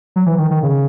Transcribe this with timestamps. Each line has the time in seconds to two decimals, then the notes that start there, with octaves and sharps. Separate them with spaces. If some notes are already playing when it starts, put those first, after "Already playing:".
0.16 F#3
0.26 E3
0.38 D#3
0.51 D#3
0.63 C#3